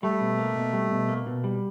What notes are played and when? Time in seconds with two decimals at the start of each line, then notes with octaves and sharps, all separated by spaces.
0.03 G3 A3
0.21 B2
0.39 A#3
0.56 B2
0.73 G3
0.91 B2
1.09 A#3
1.26 B2
1.44 G3